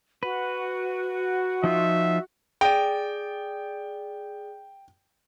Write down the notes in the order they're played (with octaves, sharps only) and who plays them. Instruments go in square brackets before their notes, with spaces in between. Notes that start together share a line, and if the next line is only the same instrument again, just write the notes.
[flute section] F#4 F#5 [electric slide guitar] B4
[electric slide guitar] F3 D#4 F4 [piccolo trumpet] E5
[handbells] G#4 D5 [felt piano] G5